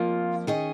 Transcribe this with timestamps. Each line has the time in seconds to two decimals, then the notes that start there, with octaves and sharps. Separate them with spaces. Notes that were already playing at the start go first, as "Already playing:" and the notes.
Already playing: F2 F3 A#3 F4
0.47 D#3 C#4 G#4 D#5